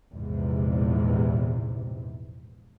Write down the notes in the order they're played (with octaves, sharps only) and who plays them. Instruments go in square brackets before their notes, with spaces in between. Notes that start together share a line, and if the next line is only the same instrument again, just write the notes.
[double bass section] A#1 E2 G#2 C3